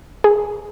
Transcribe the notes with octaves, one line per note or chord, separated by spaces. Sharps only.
G#4